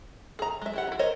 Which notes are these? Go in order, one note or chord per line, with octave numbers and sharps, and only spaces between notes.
G#4 A#5
G#3 E5
E4 G4 F#5
D#4 E4
A#4 C5 C#5 D#5